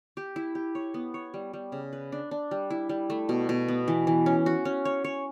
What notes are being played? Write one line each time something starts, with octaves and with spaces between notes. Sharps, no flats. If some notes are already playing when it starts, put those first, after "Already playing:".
G4
E4
G4
C#5
B3
C#5
G3
G3
C#3
B4
D4
D4
G3
E4
G3
A3
B2
B2
B3
E3
E3
C#4
F#4
C#4
C#5
C#5